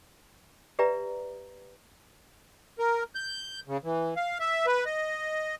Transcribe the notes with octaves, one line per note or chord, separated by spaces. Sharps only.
G4 B4 D5 E5 A#5
A#4
G6
C#3
E3
F5
E5
B4
D#5